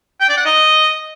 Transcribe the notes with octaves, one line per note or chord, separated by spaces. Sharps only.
G5
D5
F#5
D#5